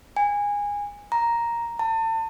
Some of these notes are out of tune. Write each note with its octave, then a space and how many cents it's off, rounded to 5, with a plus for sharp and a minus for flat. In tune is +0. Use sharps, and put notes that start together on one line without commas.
G#5 -20
A#5 +5
A5 +35